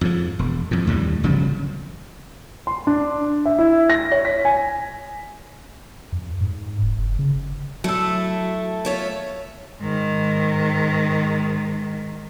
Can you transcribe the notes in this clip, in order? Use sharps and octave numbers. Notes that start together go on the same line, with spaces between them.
F2 G#2 F3
E1
F2 A2
D#2 A2 D3 G3
G1 C#3 F3 F#3
C6
D4
E5
E4
A#6
C#5
B6
G#5
F2
G#2
E1
F#1
C#3
F#3 A3 E4 A4
F4 C#5 E5
G#2 D#3